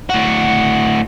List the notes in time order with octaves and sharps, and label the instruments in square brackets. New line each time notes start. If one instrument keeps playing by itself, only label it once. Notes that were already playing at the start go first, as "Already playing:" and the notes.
[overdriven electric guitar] A2 F#4